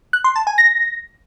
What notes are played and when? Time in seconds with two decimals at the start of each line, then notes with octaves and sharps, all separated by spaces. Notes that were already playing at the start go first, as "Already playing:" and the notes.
0.13 F#6
0.24 C6
0.36 A5
0.47 G#5
0.58 A#6